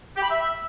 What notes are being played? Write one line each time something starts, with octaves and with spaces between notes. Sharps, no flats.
G4
B5
E5